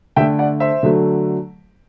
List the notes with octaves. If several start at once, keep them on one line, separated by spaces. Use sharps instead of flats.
D3 A3 E5 G5
D5 F#5
C5 E5
D3 F#3 A3